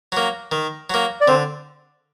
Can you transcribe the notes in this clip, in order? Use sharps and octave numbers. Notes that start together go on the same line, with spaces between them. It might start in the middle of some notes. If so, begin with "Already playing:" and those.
F#3 A#3
D#3
F#3 A#3
D5
D3 C4 C5